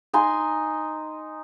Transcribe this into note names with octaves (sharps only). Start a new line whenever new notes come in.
D#4 G#5 C6